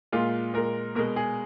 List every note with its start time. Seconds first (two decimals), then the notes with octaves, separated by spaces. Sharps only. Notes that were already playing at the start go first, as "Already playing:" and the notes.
0.12 A#2 G#3 F4
0.53 A#2 G#3 A#4
0.95 B2 A#4
0.99 G#3
1.16 G#4